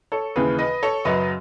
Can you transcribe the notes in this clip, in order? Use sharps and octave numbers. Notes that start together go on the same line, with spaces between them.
A4 C#5
D#2 C#3 E3 G#4 B4
B4 D#5
A4 C#5
F#2 C#3 F#3 B4 D#5